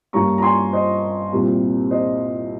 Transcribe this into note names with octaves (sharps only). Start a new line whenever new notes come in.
G2 G3 A#3 C#4 A#5 C#6
A#5
G#5 C6
C5 D#5
C2 A#2 G3 C4
C5 D#5